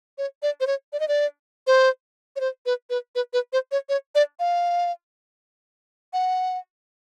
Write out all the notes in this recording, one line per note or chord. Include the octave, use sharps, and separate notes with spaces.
C#5
D5
C5
C#5
D5
D#5
D5
C5
C#5
C5
B4
B4
B4
B4
C5
C#5
C#5
D5
F5
F#5